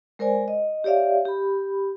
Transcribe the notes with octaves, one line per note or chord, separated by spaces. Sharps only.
G#3 A#4 C5 D5 G#5
D#5
G4 C#5 D5 E5 F5
G4 B5